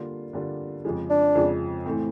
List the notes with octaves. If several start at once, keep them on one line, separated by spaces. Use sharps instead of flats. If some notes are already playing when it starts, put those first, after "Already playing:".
Already playing: D3 G3 A#3 D4 F4
D3 G3 A#3 D4 F4
F2 C#3 F3 G#3
D4
F2 C#3 F3 G#3
A2 E3 A3 C4